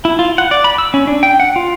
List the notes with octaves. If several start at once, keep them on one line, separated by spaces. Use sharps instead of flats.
E4
F4
F#5
D5
B5
E6
C#4
D4
G5
F#5
F4